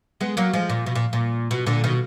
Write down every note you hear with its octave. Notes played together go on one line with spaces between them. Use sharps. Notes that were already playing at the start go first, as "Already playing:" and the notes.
G#3 B3
F#3 A#3
F3 G#3
A#2
B2
A#2
A#2
B2
A#2 D3
B2 D#3